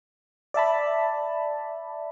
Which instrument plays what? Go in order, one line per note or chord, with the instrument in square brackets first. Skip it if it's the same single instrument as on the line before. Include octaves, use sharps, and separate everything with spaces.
[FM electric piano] D5 E5 A5 B5